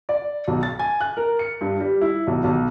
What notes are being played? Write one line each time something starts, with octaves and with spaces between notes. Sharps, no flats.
D5
B1
A6
G#5
F#6
A#4
C#7
G2
G3
E4
B1
B1